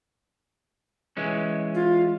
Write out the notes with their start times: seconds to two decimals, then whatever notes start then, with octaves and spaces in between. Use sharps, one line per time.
1.17 E3 G#3 C#4
1.74 F4